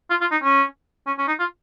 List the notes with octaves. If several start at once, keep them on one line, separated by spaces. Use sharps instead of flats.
F4
F4
D#4
C#4
C#4
C#4
D#4
F4